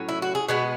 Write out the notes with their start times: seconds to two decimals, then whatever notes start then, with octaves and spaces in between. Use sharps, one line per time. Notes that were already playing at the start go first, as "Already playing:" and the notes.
Already playing: A2 F#3 C#4
0.09 E4
0.22 F#4
0.35 G#4
0.48 B2 G#3 B3 F#4